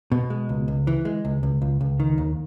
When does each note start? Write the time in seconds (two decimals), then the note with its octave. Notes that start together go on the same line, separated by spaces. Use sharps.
0.12 B2
0.30 G#3
0.49 C#2
0.68 C#2
0.87 E3
1.05 G#3
1.25 C#2
1.43 C#2
1.62 C#2
1.81 C#2
2.00 D#3
2.18 D#2